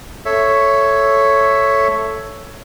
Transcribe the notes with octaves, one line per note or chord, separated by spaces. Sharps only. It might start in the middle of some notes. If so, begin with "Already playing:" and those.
A4 C#5 E5